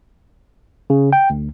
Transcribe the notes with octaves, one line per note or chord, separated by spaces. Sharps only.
C#3
G5
D2